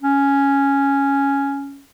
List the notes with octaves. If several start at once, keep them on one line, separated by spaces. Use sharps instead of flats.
C#4